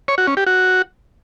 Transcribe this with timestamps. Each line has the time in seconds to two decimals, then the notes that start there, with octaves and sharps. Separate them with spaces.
0.08 C#5
0.18 F#4
0.27 C#4
0.37 G4
0.47 F#4